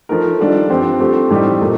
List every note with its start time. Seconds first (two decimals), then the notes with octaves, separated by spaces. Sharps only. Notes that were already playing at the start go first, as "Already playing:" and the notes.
0.09 F3 A3 D#4 A#4
0.39 D#3 G3 D4 F4 A4
0.70 G2 F3 C4 G4
1.00 F3 A3 C4 G4
1.31 A2 G3 C4 D#4 G4
1.61 A#2 A3